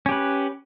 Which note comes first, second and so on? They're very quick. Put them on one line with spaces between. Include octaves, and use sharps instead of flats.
C#4 G4 B4